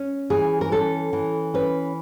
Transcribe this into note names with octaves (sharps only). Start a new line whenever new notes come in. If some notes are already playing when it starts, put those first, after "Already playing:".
Already playing: C#4
E3 G#4
A#4
C#4 A4
E3
C#4 B4